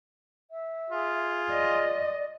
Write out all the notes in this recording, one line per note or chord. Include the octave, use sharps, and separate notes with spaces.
E5
F4 G#4
D5 D#5